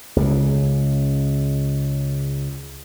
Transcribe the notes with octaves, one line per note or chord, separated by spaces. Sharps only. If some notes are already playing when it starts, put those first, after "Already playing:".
C#2 C#3